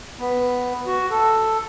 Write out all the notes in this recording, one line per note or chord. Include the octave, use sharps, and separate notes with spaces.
B3
F#4
A4